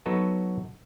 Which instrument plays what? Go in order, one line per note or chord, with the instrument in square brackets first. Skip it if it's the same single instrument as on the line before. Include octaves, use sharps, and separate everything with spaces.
[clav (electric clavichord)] F#3 B3 D#4 F#4 A4 B4